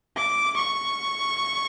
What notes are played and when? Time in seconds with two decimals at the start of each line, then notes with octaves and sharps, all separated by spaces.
0.17 D6
0.56 C#6